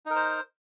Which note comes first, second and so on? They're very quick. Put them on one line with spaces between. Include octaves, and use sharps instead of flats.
D#4 A#4 C5